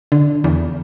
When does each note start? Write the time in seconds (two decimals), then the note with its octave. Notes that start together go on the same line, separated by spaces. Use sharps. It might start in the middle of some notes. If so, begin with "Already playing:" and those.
0.12 D3
0.44 E2